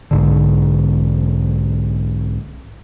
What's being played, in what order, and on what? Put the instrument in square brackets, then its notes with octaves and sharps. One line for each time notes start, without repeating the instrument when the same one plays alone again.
[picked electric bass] B1 G#2 D3